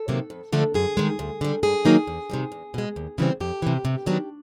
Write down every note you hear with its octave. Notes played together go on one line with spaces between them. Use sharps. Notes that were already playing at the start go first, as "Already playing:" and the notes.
Already playing: A4
C3 D#3 F#3 A#3
F2
D3 F3 A3 D4
F#2 G#4
D#3 G#3
D2
D3 G3
G2 G#4
D#3 F#3 A#3 D#4
E2
C3 D#3 G3
E2
B2 G#3
D#2
C#3 E3 G3 C4
F2 G4
C3 E3
C3
D#3 F#3 B3 D4